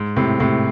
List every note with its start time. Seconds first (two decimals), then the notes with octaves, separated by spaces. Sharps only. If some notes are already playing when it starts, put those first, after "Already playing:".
Already playing: G#2
0.16 A2 C3
0.40 A2 C3